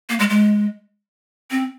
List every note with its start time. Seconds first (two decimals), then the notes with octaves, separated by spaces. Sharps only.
0.09 A#3
0.19 G#3
0.30 G#3
1.51 C4